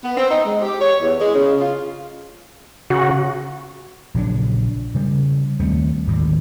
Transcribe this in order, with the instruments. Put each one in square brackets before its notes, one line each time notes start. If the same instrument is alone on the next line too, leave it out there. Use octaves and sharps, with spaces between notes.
[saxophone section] B3
C4
D#4
G#3
G4
C#5
E2
G#3
C#3
F4
[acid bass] C#3 [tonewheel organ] F#4
[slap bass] A#1 C#3 F#3 D4
C#3 G3
D#2 G3 A3 C4
G#1 D#2 A2 D3